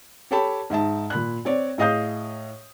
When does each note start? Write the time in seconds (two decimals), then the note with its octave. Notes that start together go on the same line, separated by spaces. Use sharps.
0.31 G4 A4 C#5 G5 A5 B5
0.70 G#2 D#4 E5 A5
1.10 A#2 B5 F#6
1.45 C4 C#5 D5
1.78 A2 G#4 D#5 F5 D#6 G6